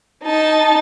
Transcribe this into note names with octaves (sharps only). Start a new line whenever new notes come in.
D#4 A5